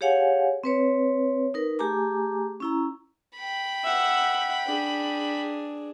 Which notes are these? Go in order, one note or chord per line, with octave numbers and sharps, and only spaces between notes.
G4 G#4 C#5 F5 F#5 G#5
C4 B4 C#5
D#4 A#4 B4
A3 G4 G#4 G#5 A#5 D6
C#4 E4 A#5
G5 B5
E5 F#5
D4 G#4